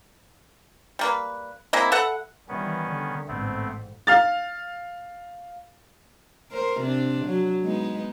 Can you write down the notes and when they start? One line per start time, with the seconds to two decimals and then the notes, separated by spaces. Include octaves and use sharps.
0.99 G3 A#3 B4
1.73 G#3 A#3 C4 E4
1.92 A4 B4 E5 F#5
2.49 D#3 E3 G3 B3 C#4
2.91 D3
3.28 A1 G#2 A3 B3 C4
4.07 F5 F6 A6
6.51 A#4 C5
6.81 C3 D4
7.26 F#3
7.63 G#3 B3 D#4